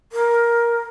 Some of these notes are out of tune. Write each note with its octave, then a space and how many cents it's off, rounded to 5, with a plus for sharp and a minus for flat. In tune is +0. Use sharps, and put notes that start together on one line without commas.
A#4 +10